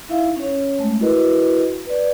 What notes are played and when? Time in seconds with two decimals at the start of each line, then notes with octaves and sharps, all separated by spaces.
0.09 D#4 E4 E5 F5
0.36 C#4 C#5
0.79 G#3 A3
1.00 E4 F#4 A#4 B4 D#5
1.86 B4 D5